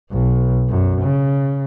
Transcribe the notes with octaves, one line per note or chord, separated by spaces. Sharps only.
B1
F#2
C#3